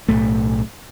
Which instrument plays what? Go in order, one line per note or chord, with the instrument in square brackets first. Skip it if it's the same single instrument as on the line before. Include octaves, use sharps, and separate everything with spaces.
[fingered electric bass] B1 F2 A2 A3